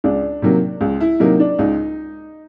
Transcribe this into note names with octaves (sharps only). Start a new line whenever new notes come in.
C#2 D4
C3 D#3 F#3 A#3
C#2
E4
C3 D#3 F#3 A#3 D#4
D4
C#2 D#4